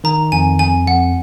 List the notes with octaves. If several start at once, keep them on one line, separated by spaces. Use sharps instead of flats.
D#3 A#5
F2 G#5
F2 G#5
F2 F#5